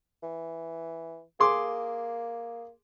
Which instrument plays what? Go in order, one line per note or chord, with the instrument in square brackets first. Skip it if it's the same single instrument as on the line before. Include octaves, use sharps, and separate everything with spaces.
[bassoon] E3
[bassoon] A#3 [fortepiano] G#4 C6 D6